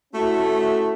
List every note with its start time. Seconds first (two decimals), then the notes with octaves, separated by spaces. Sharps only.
0.14 A3 C#4 E4 F#4